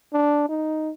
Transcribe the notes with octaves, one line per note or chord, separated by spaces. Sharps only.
D4
D#4